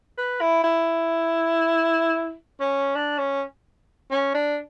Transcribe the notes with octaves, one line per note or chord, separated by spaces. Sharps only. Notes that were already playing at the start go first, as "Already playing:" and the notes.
B4
E4
E4
C#4
D4
C#4
C#4
D4